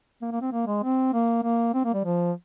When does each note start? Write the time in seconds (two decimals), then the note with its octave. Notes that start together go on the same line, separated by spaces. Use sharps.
0.22 A#3
0.32 A#3
0.41 C4
0.52 A#3
0.67 G#3
0.83 C4
1.14 A#3
1.43 A#3
1.74 C4
1.85 A#3
1.94 G3
2.05 F3